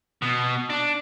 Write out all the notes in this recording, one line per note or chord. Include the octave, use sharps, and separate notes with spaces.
B2
D4